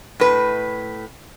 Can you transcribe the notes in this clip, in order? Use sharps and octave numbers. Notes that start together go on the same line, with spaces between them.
A2 B4